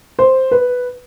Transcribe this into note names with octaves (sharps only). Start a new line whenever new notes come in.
C5
B4